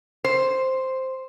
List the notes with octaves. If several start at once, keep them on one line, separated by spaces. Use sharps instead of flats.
C5